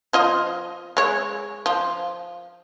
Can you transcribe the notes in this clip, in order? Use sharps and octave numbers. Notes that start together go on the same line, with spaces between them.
F3 F4 D#5
G#3 C#5
F3